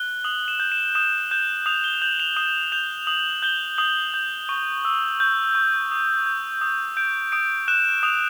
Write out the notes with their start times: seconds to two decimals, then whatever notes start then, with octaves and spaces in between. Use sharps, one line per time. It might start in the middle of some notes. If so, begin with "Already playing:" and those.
Already playing: F#6 G7
0.24 D#6 F#7
0.48 E7
0.60 G6
0.72 E7
0.95 D#6 E7
1.31 G6 E7
1.66 D#6 F7
1.84 G7
2.02 G6 F#7
2.20 F7
2.36 D#6 E7
2.72 G6 F7
3.07 D#6 F#7
3.42 G6 G7
3.78 D#6 F#7
4.14 G6
4.49 C#6
4.85 E6
5.20 G6
5.55 C#6
5.91 D#6
6.26 G6
6.61 D#6
6.97 G6 D7
7.32 D#6 D7
7.68 F#6 E7
8.03 D#6 F7